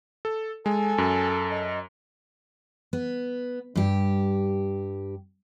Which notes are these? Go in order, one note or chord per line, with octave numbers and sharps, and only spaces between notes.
A4
G#3 A4 G#5
F#2
D#5
B3
G2 G4